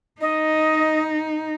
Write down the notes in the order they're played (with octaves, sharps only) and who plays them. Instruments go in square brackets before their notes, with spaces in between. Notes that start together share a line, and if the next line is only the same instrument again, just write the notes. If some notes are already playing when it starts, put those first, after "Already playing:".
[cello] D#4 [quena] D#5